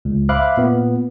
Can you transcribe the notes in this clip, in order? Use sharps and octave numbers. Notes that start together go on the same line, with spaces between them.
C#2
C5 E5 F5 B5 D6 F#6
A#2 B3